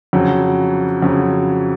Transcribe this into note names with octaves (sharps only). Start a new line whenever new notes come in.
F2 C#3 F#3
F2 C#3 F#3